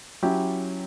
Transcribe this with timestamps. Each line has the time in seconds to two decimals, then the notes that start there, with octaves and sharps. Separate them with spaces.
0.23 F#3 C#4 E4 G4